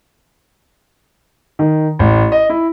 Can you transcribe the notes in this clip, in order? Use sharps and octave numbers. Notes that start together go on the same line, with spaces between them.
D#3
A1
D#5
E4